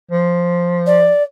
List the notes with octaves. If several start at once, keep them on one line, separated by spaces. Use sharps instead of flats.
F3
D5